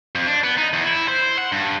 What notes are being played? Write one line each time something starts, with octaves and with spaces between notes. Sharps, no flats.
F2
D4
B3
D#4
E2
E4
C5
F#5
G2